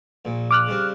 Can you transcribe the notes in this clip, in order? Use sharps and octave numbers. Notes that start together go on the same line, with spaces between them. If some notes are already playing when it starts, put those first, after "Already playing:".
A#1 A#2
D6 F6 F#6
C#3 G3 C4